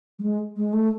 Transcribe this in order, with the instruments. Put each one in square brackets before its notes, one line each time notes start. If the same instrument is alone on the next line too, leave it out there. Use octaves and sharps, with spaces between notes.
[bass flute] G3
G#3
G#3
A3